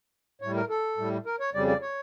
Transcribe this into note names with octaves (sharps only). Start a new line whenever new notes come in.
A2 G3 C#5
A#4
A4
A2 G3
A#4
C#5
F2 C#3 G3 D5
D5
C#5